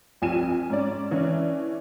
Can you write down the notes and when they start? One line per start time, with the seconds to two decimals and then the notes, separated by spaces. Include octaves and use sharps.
0.22 C2 F2 F3 G#5 D#7 E7
0.70 G#2 C#4 D5
1.11 E3 C#4 D4 E4